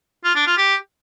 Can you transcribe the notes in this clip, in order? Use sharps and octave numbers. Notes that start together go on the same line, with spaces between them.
F4
D4
F4
G4